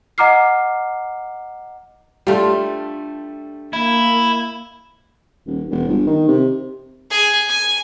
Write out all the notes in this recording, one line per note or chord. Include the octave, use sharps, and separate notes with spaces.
D#5 F#5 A#5 D6 F6 C7
G3 A3 D4 F4
A#3 E4
D#1
E1
G1
D#3
C3
G#4
G#5